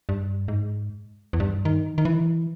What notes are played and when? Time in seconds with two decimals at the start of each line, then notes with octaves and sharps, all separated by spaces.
0.09 G2
0.48 G#2
1.33 E2
1.40 G2
1.65 D#3
1.98 D#3
2.05 E3